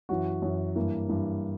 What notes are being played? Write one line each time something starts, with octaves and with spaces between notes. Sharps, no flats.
F#2 E3 F#4
F#2 E3
G2 E3 A#3
G2 E3